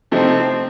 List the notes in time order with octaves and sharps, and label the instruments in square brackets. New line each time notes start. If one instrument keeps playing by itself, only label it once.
[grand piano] C3 F3 A3 D#4 [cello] C4